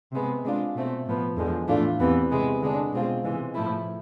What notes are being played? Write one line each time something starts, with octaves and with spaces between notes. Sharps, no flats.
C3 G#3 B3
C3 G#3 D4 F4
B2 A3 C4
A2 F3 B3
E2 D3 F3 G#3
A2 E3 A3 D4 F4
E2 C3 E3 B3
C3 G#3 B3
D3 G#3 D4
B2 G#3 C4 F4
C3 E3 G#3
A2 F3 A3 E4